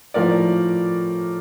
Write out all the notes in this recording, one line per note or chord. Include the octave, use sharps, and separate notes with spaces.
A2 F3 A#4 D5